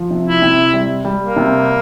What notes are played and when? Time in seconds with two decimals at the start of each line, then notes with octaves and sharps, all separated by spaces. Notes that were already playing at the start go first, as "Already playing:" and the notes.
Already playing: F3
0.11 C3
0.27 E4
0.42 C3
0.73 G3
1.05 G3
1.20 A#3
1.36 C3